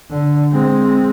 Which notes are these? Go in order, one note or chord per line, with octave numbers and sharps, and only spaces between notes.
D3
G#3 C4